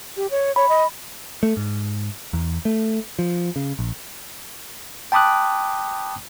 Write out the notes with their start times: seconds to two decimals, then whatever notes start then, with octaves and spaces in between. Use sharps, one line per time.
0.17 G4
0.31 C#5
0.56 C#5 B5
0.69 D#5
1.43 A3
1.57 G#2
2.33 E2
2.65 A3
3.19 F3
3.56 C#3
3.79 A#1
5.12 G5 A5 B5 D6 D#6 F#6